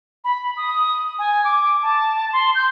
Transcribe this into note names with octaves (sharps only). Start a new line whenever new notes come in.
B5
D#6
G#5
D6
A5
C6
G6